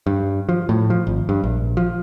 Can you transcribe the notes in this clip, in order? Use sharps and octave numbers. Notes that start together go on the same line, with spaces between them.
G2
F3
A2
F3
G#1
G2
A#1
F3